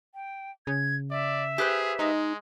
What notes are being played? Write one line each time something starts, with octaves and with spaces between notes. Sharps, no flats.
G5
C#3 G#6
D5 E5
G4 G#4 B4 C5
G#3 D#4